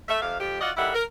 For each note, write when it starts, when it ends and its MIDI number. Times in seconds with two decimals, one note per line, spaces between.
0.09 0.18 57
0.09 0.18 76
0.22 0.39 41
0.22 0.39 48
0.22 0.39 77
0.40 0.60 41
0.40 0.60 67
0.61 0.71 65
0.61 0.71 66
0.61 0.71 74
0.61 0.71 75
0.61 0.71 77
0.61 0.71 78
0.77 0.91 50
0.77 0.91 51
0.77 0.91 55
0.77 0.91 64
0.77 0.91 76
0.77 0.91 78
0.95 1.03 70